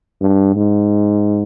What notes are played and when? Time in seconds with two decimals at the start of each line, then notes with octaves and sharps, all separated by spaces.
0.21 G2
0.55 G#2